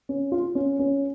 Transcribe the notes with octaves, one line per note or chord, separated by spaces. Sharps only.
C#4
F4
C#4
C#4